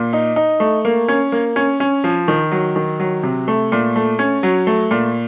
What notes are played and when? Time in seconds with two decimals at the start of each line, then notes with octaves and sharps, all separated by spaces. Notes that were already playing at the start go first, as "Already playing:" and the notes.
Already playing: A#2
0.13 D#4
0.36 D#4
0.60 A3
0.85 A#3
1.08 C#4
1.32 A#3
1.56 C#4
1.80 C#4
2.04 F3
2.28 D#3
2.52 F#3
2.76 D#3
3.00 F#3
3.23 C3
3.48 A3
3.72 A#2
3.96 A3
4.19 C#4
4.43 F#3
4.67 A3
4.91 A#2